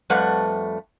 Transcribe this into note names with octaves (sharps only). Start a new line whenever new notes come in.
F2 G3 A3 B4 F#5